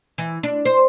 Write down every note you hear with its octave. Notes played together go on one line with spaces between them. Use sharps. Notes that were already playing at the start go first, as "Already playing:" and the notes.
E3
D4
C5